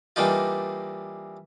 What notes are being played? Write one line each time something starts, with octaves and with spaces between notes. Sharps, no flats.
E3 G3 A#3 D4 D#4 F4